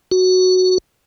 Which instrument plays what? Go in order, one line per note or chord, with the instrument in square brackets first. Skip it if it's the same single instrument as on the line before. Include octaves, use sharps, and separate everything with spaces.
[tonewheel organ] F#4